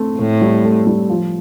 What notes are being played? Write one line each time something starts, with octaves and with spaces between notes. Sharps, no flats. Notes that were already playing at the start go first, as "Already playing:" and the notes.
Already playing: A3 C4
A2 A3
G3
A3
G3
F3